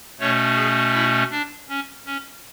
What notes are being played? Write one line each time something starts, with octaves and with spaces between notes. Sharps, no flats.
B2 A3 C#4 C#5
G#4
E4
D4
C#4
C#4